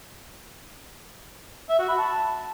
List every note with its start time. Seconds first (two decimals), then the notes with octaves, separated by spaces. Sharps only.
1.70 E5
1.79 F#4
1.89 B5
1.98 A5